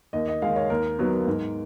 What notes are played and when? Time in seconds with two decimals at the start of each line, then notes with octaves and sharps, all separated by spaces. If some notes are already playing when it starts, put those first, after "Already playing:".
0.13 D#2 D#5
0.28 D#5
0.42 D#3 G#3 F5
0.56 C#5
0.70 D#2 A#4
0.99 D#3 F#3 B3
1.27 G#2